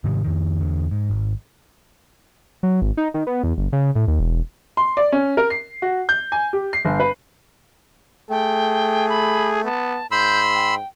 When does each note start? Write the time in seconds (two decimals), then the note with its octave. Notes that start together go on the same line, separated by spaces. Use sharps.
0.04 G#2 C3 D#3 G3
0.24 F2 D#3
0.60 E2 D3
0.91 G#2
1.10 G#1
2.63 F#3
2.82 G#1
2.97 D#4
3.14 D#3
3.27 B3
3.44 E2
3.58 G1
3.73 C#3
3.95 A2
4.08 D#2
4.20 E1
4.77 C6
4.97 D5
5.12 C#4
5.37 A#4
5.50 C7
5.82 F#4
6.09 G6
6.32 G#5
6.53 G4
6.73 C7
6.85 G1
7.00 B4
8.30 A3 G#4 G5
9.09 B5
9.64 B3 A5
10.11 G#2 B5 C6 E6 G6
10.55 G5